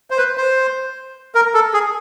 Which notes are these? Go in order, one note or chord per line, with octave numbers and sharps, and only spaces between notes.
C5
B4
C5
A#4
A4
G#4